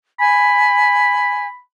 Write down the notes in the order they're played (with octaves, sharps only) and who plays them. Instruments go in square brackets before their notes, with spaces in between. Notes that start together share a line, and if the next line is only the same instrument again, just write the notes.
[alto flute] G#5 [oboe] B5